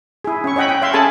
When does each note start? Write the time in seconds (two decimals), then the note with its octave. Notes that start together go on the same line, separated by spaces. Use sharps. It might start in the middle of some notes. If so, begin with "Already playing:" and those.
0.24 E4 G#4
0.44 C#4 C#6
0.56 C#5 D#5 F#5 G5 B5
0.69 G5
0.82 C#5 E5 F5 C6
0.93 C#4 G#4 A4 G#5 A5 B5